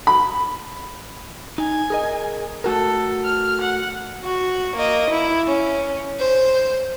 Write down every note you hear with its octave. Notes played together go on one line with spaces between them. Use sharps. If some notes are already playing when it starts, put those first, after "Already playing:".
B5
D#4 G#5
G#4 A#4 D#5
A3 F#4 A4 A#4
F6
F#5
F#4
A#3 D#5
E4
C#4
C5